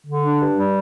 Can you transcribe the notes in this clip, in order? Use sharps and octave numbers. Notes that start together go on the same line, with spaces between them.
D3
D4
G2
G3